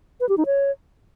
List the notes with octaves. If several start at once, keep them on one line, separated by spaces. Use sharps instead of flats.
B4
G4
D#4
C#5